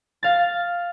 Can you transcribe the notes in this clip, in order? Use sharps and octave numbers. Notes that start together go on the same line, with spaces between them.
F5 A6